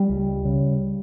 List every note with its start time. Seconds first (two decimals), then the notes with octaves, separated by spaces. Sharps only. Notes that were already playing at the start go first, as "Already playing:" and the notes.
Already playing: G3
0.09 C#2
0.45 C#3